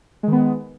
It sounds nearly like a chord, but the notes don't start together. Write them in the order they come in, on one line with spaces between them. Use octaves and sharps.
G#3 D#3 B3